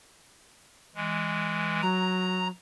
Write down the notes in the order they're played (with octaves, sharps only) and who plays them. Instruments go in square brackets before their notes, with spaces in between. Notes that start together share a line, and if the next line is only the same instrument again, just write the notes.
[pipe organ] E3 G#3
[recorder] F#3 [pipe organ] A#5